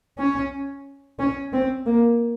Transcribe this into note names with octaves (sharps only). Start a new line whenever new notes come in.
C#4
C#4
C4
A#3